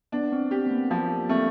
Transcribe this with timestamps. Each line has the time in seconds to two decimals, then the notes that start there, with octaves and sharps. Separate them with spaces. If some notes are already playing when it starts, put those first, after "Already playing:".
0.12 B3 D4
0.32 C4
0.51 C4 G4
0.66 B3
0.71 A#3
0.90 F3 A#3
1.29 A3 C4